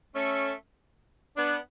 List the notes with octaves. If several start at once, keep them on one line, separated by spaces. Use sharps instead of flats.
A3 C#4
B3 D4